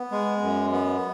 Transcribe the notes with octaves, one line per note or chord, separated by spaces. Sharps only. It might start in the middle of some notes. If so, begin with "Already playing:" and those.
Already playing: B3
G#3
F#2
B3